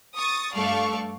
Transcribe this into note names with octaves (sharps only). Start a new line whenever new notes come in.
C#6 D#6 A6
G2 A3 A4 D5 F5 C#6